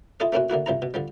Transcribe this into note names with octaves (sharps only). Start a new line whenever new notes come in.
E4 F4 A4 D#5 F5
A3 A#3 C4 C#4 E4 F#4
D3 A#3 E4 F#4
C2 F3 E4 A#5
B2
D3 F3 G3